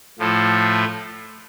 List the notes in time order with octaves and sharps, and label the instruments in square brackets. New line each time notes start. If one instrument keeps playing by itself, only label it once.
[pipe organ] A2 F3 A3